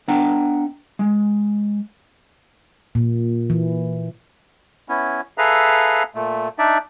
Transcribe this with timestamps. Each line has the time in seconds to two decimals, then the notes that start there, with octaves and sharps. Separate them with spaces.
0.08 B3 D4 D#5 F#5 G5 A#5
0.99 G#3
2.95 A#2
3.50 E3
4.89 B3 C#4 E4
5.38 G#4 A4 B4 E5 F5 A#5
6.15 A#2 A3
6.59 D4 D#4 D5 E5